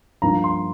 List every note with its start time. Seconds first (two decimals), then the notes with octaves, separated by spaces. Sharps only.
0.22 G2 F3 A#3 A#5
0.44 C6